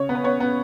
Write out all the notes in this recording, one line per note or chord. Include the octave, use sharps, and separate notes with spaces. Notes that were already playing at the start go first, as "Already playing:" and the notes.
Already playing: C#3 C#5
B3
B4
B3 C#5
B3